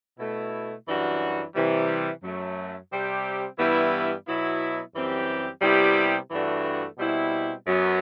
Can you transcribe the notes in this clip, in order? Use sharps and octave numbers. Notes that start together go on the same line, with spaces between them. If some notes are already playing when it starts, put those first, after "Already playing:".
B2 A3 E4
F#2 E3 G3 D4 F#4
C3 E3 G3
F#2 F#3 A3
C3 G3 C4 G4
G2 E3 G3 B3 E4
B2 F#3 B3 E4
F#2 E3 G3 C4 G4
C3 G3 B3 E4 G4
G2 E3 A3 D4 F#4
B2 G3 C4 E4
F#2 F#3 B3